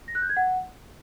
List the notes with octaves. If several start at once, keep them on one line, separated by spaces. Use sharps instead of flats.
A#6
F#6
G6
G#6
F#5